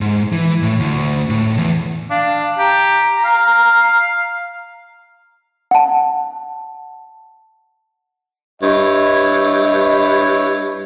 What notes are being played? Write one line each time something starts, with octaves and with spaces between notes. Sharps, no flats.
G#2
E3
A2
D2
A2
E2
D4 F5
G4 A#5
F5
F#5 A5
G2 E4 C#5 D#5